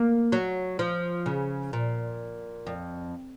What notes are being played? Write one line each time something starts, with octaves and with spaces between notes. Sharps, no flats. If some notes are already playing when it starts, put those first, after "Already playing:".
Already playing: A#3
F#3
F3
C#3
A#2
F2